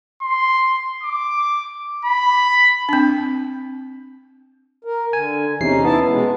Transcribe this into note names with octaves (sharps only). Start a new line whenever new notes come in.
C6
D6
B5
C4 D4
A#4
D3 G#5
E2 C3 C#4 D#4 C7
B3 E4 A5
B2 G#3